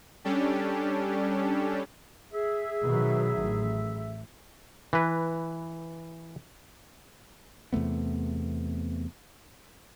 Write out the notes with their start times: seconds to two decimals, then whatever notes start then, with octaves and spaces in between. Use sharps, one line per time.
0.24 G3 C#4 D4 G4 A4
2.33 G#4 E5
2.83 B2 D#3 F#3
3.38 A1
4.93 E3 B4
7.73 E2 C3 A3 B3